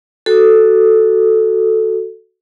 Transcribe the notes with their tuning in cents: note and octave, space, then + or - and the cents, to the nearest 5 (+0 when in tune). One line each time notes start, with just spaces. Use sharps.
F#4 +0 A4 +0